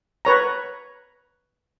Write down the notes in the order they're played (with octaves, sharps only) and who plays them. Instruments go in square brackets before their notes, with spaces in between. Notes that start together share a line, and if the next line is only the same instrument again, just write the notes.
[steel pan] B4 C#5 A#5